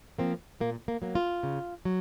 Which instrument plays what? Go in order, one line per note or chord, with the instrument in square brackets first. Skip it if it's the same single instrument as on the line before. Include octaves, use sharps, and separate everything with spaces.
[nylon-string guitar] F3 A#3 C4
A#2 A#3
A#3
F#3 A#3
F4
C#3
F#3